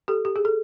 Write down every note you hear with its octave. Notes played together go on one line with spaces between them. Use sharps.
G4 A4
G4
G#4
A4